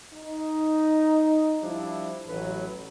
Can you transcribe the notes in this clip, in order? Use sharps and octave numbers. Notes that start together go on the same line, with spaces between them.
D#4
F3 G3 D4 E4
A1 A2 E3 F#3 B4